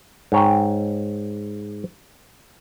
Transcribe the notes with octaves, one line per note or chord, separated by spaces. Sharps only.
G#2 C#5 G5